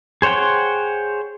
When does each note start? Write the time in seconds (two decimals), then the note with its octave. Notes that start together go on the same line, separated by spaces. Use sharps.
0.22 G#4 C5 C#5 F#5 G5